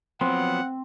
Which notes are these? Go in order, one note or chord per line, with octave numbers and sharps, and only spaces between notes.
F3 F#3 B3 C4 F#5